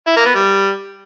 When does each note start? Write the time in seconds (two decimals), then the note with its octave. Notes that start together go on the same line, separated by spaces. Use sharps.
0.07 E4
0.16 A#3
0.26 B3
0.35 G3